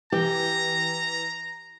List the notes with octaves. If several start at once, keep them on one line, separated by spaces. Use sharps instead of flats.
E3 G4 A#5